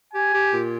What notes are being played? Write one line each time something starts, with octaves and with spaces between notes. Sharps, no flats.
G4 G#5
G4
A#2